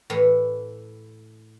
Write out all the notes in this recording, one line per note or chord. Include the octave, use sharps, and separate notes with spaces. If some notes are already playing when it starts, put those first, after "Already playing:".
A2 E3